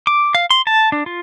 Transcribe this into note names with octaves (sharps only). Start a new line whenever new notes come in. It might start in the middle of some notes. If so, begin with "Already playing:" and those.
D6
F5
C6
A5
D4
F4